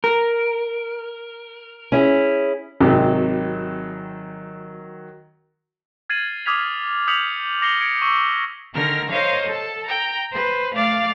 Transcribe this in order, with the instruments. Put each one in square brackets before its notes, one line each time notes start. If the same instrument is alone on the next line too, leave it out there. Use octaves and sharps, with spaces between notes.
[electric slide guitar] A#4
[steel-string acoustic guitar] C#4 E4 G#4
[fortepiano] G#1 C3 G4 [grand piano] D#3 F#3
[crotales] F6 G#6 A6 C7 D#7 F#7
D6 D#6 F6 G#6 B6 F7
D#6 G6 B6 C#7 F7 F#7
D6 A#6 C7 C#7 F7 G7
G#6 C#7 D7
C#6 E6
[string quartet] D3 D#3 A#4 F6 A#6
A#4 C5 C#5 D#5 F5
A4 A5
G5 A#5
B4 C5
A3 D5 F5 D6 F6 A6